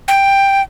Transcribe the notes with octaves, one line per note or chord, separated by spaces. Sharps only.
G5